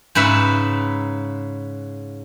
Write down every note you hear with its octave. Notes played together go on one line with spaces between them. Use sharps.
G#2 C#3 B4 E5